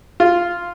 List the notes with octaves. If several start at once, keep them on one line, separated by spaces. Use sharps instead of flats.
F4